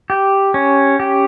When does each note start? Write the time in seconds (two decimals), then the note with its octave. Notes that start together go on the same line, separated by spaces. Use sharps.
0.10 G4
0.54 C#4
1.00 G4